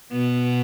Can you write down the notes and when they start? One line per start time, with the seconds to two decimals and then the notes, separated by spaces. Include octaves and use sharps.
0.12 B2 B3